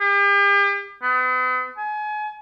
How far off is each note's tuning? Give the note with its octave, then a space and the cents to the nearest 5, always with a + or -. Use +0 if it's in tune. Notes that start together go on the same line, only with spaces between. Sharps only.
G4 +40
B3 +45
G#5 +35